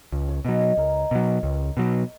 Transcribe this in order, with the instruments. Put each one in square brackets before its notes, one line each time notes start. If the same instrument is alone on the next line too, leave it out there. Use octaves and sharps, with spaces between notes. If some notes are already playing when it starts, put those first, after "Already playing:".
[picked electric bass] C#2
[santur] C#5
[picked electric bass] B2 F#3 [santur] D#5
[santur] C#5
[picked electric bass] C#2 [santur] A#4
[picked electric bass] B2 F#3 [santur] C#5
[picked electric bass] C#2 [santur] C#5
[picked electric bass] B2 F#3